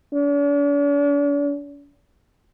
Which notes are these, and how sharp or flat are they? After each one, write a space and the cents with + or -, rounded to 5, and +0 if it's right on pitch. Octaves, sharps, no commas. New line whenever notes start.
D4 -45